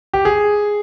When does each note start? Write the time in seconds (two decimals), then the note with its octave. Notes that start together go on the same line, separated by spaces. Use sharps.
0.14 G4
0.25 G#4